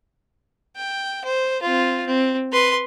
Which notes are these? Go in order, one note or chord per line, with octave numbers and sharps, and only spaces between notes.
G5
C5
C4 F4
C4
B4 C6